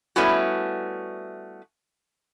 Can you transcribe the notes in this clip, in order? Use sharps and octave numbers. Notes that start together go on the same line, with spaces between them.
G3 A3 B3 C#4 E4 F#4